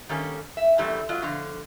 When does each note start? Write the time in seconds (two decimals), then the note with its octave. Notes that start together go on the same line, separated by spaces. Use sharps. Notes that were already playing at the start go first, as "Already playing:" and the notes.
0.09 D#3 G3 A#3 C#4 A4
0.57 E5
0.78 F#2 B2 E3 G3 A3
1.09 F#3 F4 F#4 D#5
1.22 B2 D3 F3 F5